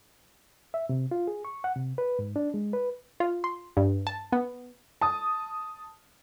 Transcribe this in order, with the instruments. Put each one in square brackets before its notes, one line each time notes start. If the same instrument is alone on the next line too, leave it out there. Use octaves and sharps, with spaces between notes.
[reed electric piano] E5
C3
F4
G#4
C#6
F#5
C3
B4
G#2
D4
G#3
B4
[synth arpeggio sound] F4
C6
G2
A5
B3
[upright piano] A5 D#6